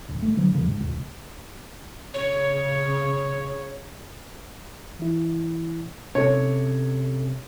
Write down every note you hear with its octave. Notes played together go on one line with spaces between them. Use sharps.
D1
A3
D3 F#3
D#2 C#3 F3
G#2
D#1 C#2
C#3 C#5
E3 E4
C3 C#4 A4 C#5